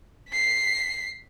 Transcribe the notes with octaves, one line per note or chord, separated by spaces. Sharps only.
B6 C7